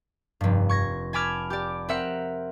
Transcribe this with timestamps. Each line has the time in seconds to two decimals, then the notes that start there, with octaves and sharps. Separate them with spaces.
0.41 F1 G2
0.69 C#6 G#6 A#6
1.13 G#5 A5 B5 D6 F6 G#6
1.50 G4 D5
1.89 C4 A#4 E5 F#5 C#7